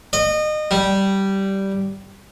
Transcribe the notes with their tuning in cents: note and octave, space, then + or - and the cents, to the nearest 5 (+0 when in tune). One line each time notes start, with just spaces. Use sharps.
D#5 -30
G3 -10